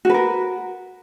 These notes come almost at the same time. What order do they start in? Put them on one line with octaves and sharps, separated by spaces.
F#4 B4 A#4